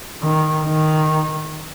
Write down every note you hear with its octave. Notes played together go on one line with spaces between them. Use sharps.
D#3
D#3